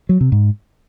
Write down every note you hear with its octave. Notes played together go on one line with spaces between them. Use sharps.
F#3
C3
G#2